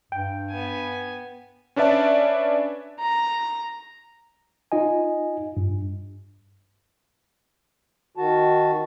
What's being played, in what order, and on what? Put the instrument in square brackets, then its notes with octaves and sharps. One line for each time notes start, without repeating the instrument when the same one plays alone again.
[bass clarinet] G2 [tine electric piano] G5
[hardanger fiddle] B3 G#5
[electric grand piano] C#4 D4 B4 D5 E5 A5
[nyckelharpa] A#5
[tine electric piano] D#4 F4 D#5 G#5
G2
[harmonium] D#3 F#4 A5